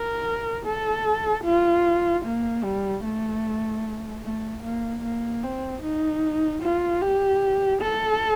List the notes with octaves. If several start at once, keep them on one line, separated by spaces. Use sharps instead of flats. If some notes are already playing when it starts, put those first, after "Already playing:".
Already playing: A#4
A4
F4
A#3
G3
A3
A3
A#3
A#3
C4
D#4
F4
G4
A4